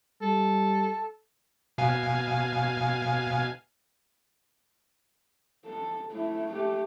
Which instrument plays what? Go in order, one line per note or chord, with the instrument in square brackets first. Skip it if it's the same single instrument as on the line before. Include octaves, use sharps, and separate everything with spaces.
[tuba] G3 [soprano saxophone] A4
[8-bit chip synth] B2 F5 G#5
[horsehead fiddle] A4
A3 E4
A3 G4